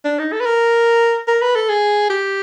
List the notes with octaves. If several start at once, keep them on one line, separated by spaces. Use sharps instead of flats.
D4
D#4
A4
B4
A#4
A#4
B4
A4
G#4
G4